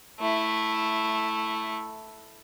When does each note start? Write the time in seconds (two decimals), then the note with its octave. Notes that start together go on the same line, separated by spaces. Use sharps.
0.20 A3 E4